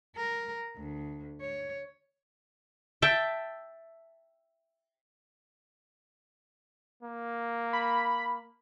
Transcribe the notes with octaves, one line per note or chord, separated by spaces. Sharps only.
A#4
D2
C#5
E5 G5 A5
A#3
B5